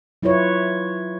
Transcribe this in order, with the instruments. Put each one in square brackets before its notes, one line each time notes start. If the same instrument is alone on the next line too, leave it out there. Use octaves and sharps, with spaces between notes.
[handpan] F#3 E4 F4 B4 C#5